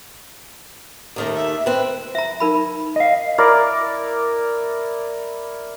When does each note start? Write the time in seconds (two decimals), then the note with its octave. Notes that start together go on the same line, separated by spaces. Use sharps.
1.16 D#2 D#3 A3 A#4
1.35 E5
1.66 C4 B4 F#6
2.15 E5 A#5
2.40 D#4 A#4 B5
2.96 D#5 F5
3.38 E4 A#4 D5